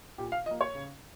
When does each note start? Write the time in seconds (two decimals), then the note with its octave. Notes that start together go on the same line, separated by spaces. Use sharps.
0.18 A#2 G4
0.32 F5
0.46 F3 D#5
0.51 A#3
0.61 C#5
0.75 C#3